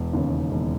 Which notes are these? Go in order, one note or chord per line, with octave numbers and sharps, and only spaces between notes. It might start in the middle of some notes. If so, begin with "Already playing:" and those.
Already playing: E1
D#2 C#3
E1